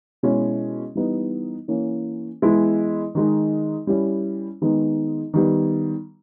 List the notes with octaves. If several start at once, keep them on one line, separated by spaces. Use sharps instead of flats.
B2 G#3 C#4 E4
E3 G3 B3 D#4
E3 A#3 C#4
E3 G#3 B3 E4
D#3 G#3 D#4
G3 C#4 E4
D#3 G#3 B3 D#4
D#3 G3 B3